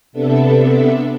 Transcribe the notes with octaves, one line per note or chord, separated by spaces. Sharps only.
C3 B3 D4 A4 E5